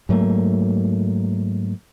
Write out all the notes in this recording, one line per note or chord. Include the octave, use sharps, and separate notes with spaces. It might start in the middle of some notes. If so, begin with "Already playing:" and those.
G#2 F#3 A3 A#3